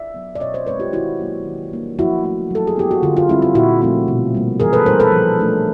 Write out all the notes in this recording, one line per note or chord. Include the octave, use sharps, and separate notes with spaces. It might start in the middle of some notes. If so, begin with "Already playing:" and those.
Already playing: D5 E5
F#3 B3
D5
B2 C#5 D#5
C5 D5
G#3 C4 D#4 B4 C#5
F4 G4
D#3 E4 F#4
F#3 A#3 D#4
D#3
G3 A#3 D4
F3 E4 F#4
A3 C#4 E4
F#3 A4
G#4
B3 E4 G4
F#4
D3 F4
F4
G3 C4 D#4 E4
F4
A#2 E4 F#4
F3 A3 C4 E4
B2
G3 A#3
E3 G#4 A#4
A4 B4
G3 B3 D#4 A#4 C5
A4 B4
F3
A3 D4